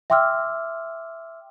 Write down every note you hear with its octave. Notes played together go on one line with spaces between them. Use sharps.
E5 G5 C6 D6 E6 F6